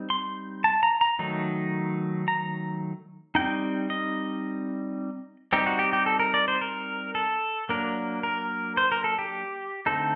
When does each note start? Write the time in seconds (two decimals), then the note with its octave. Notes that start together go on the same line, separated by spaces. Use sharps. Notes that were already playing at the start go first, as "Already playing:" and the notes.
Already playing: G3 C4 D#4
0.10 C6
0.64 A5
0.83 A#5
1.01 A#5
1.19 D#3 F#3 A3 D#4
2.28 A#5
3.35 G3 C4 D#4 G5
3.90 D#5
5.53 G3 C4 D#4 G4
5.67 F#4
5.79 G4
5.93 G4
6.06 A4
6.20 A#4
6.34 D5
6.48 C5
6.61 A#4
7.15 A4
7.69 F#3 A#3 D4 A#4
8.23 A#4
8.77 C5
8.92 A#4
9.04 A4
9.19 G4
9.86 D3 A3 C4 D#4 A4